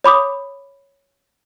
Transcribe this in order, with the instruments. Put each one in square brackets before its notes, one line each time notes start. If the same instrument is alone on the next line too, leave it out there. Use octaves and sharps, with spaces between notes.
[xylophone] C#5 B5 D6 D#6